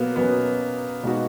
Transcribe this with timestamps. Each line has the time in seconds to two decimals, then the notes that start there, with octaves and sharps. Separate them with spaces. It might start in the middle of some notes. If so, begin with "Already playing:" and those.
Already playing: B2 F#3 A#3 B3
0.16 B2 F#3 B3 C#4
1.03 B2 G#3 D#4 F#4